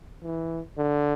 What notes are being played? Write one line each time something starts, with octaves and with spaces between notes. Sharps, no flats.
E3
D3